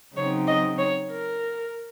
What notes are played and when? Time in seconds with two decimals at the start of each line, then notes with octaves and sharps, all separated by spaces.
0.15 C#3 F#3 C4 D#4 C#5
0.47 D#5
0.78 C#5
1.09 A#4